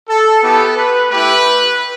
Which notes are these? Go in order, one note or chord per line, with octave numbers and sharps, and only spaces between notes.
A4
B3 E4 G4 A4
B4
A3 E4 G4 B4